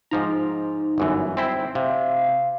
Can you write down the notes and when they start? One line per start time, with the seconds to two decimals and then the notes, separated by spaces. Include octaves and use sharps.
0.11 G#2 F3 D#4 A#5
0.98 G1 F#2 E3
1.37 C4 E4 C5
1.75 C3 F5